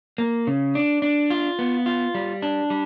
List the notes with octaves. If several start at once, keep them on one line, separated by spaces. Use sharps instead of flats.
A#3
C#3
D4
D4
F4
B3
F4
G3
D4
G3